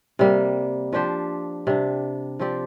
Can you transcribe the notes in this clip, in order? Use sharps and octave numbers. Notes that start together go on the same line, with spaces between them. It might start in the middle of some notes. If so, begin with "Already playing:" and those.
C3 G3 A#3
F3 D4 G4 C5
C3 G3 D4
F3 C4 G4 D5